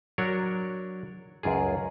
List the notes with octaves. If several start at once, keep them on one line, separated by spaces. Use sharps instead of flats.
F#3 D4 A#4 C#5 F#5
C#2 F#2 F4 G#4